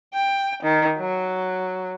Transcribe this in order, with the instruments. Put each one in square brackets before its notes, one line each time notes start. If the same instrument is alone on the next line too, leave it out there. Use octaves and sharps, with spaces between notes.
[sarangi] G5
D#3
F#3